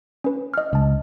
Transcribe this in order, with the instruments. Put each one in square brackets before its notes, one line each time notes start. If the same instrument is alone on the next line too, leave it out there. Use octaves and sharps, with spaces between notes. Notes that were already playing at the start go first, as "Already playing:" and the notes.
[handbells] C#4 B4
D#5 F6
[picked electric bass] C#2 [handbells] D#5 A5